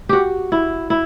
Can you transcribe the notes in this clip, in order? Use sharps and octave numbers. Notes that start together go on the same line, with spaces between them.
F#4 G4
E4
E4